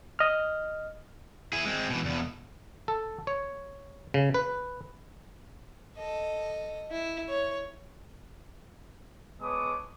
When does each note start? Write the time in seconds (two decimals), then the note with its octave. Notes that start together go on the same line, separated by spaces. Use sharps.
0.19 D#5 F6
1.53 E4 G#4
1.65 G#3 C4
1.90 B2 E3
2.05 E2 B2
2.88 A4
3.27 C#5
4.14 C#3
4.34 B4
5.97 A4 D#5
6.91 E4
7.28 C#5
9.41 G#3 B3 C#5 A5 D6 D#6